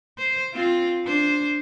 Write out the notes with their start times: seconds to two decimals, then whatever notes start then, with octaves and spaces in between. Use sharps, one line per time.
0.18 C5
0.54 C4 F4
1.05 D4 C5